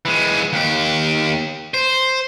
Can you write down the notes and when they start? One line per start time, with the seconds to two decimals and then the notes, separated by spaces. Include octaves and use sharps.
0.05 E3 G#3
0.53 D#2 G4
1.74 C5